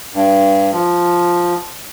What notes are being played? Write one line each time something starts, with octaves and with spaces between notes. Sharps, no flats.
G2
F3